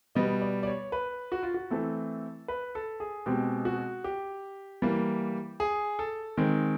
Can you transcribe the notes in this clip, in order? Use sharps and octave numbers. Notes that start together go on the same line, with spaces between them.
B2 G3 B3 D#5
D5
D5
C#5
B4
F#4
F4
F#4
E3 A3 C4 A4
B4
A4
G#4
B2 G#3 C4 G4
F#4
G4
E3 G3 A#3
G#4
A4
D#3 G#3 C4